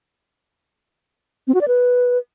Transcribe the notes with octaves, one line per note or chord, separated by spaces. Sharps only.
C4
F#4
D5
B4